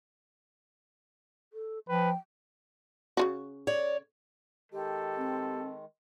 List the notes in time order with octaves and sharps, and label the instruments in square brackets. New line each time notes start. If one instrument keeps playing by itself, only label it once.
[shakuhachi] A4
[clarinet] F3 [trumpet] B4 [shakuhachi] G5
[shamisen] C#3 F4 F#4
[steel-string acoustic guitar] C#5 D5
[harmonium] D#3 G#3 [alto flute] G4 [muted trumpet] A4
[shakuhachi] C4